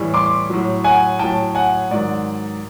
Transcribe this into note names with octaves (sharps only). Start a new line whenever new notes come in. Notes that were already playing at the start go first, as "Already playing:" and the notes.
Already playing: A2 E3 G3
C6 D6
A2 F#3
F#5 G#5
A2 F#3 G5 A5
F#5 G#5
G#2 D#3 F#3 D5